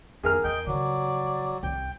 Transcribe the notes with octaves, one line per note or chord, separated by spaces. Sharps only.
F2 G#4 A#4 F6
E2 D#5 G5
C#3 F3 F#3 D5
C2 G5